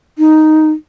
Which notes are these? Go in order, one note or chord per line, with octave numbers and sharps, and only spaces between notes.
D#4